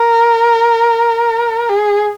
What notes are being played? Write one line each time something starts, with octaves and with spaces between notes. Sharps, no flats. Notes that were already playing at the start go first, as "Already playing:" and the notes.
Already playing: A#4
G#4